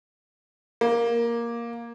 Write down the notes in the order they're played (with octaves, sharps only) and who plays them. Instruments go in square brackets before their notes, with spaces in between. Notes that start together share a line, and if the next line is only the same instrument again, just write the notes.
[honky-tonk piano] A#3